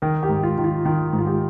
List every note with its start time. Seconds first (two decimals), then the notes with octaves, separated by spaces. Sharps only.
0.02 D#3 A#4
0.23 G4
0.29 G#2
0.43 F4
0.58 D#3
0.64 F4
0.85 D#3 F4
1.13 G#2
1.18 F4
1.27 G4